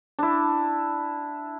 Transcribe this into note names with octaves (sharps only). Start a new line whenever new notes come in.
D4 E4